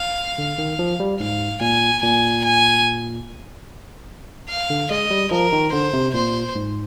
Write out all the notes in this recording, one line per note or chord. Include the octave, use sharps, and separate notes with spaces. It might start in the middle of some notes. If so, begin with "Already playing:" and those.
Already playing: F5
D3
D#3
F3
G3
G#2 F5
A#2 G#5
A#2 G#5
G#5
F5
D3
G#3 D#5
G3
F3 A#4
D#3
D3 C5
C3
A#2 C5
G#2